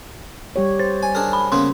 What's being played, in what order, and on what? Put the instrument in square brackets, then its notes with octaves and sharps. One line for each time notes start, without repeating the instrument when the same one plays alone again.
[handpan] G3 G4 C#5
[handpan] C5 [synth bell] A6
[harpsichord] G#5
D4 G#4 A#4
[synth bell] B5
[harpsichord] C#3 A#3 B3 [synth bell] C6